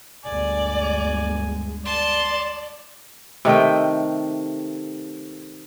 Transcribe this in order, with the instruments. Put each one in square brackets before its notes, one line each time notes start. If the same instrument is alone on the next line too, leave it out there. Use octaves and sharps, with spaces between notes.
[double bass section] G1 D2 G#3 [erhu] D5 [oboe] G#5
[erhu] D5 [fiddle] A5 C6
[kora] C3 D#3 A3 G5